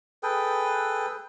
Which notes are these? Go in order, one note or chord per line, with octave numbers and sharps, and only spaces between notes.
G#4 A4 B4 G5